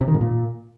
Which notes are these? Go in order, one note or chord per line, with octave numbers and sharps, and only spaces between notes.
C3
D#3
G#2
A#2